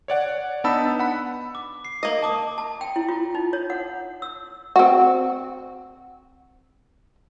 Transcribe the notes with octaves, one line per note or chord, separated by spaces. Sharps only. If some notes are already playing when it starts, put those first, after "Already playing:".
C#5 D5 F#5
B3 D4 D#4 A5 B5 E6
F#5 B5
D6
C7
A#3 D#5
A5 D6 D#6
A5
G5
E4
F4
D#4
C#5
F#5
E6
C4 F#4